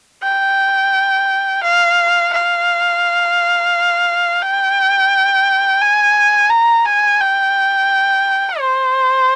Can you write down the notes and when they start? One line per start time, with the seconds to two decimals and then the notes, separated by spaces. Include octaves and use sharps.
0.23 G5
1.63 F5
2.33 F5
4.42 G5
5.81 G#5
6.50 A#5
6.85 G#5
7.21 G5
8.60 C5